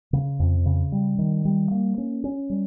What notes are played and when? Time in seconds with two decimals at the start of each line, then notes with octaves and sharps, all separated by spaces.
0.13 C#3
0.39 F2
0.66 C#3
0.92 G3
1.19 D#3
1.45 G3
1.71 A#3
1.98 C#4
2.24 C#4
2.50 G3